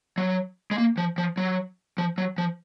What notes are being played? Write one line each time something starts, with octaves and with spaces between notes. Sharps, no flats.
F#3
G#3
A#3
F3
F3
F#3
F3
F#3
F3